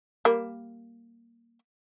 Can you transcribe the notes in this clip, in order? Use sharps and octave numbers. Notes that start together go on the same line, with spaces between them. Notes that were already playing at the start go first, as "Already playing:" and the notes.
G3 A#3